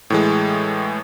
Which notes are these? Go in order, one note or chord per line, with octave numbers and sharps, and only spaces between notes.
A2 E3 G#3